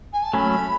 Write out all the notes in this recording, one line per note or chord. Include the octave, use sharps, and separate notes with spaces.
G#5
A5
F#3 A3 C#4 B5